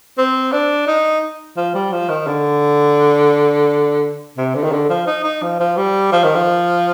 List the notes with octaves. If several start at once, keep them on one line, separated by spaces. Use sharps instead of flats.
C4
D4
D#4
F3
G3
F3
D#3
D3
C3
D3
D#3
D3
F3
D#4
D#4
F3
F3
G3
F3
D#3
F3